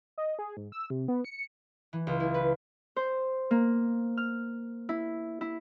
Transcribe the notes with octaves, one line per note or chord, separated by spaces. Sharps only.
D#5
G#4
G#2
E6
C3
B3
C#7
E3
C#2
E4
B4
C5
A#3
F6
E4
E4